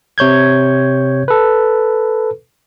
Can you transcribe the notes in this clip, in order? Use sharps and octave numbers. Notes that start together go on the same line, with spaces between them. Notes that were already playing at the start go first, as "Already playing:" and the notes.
C3 C#5 G6 G#6
A4 B4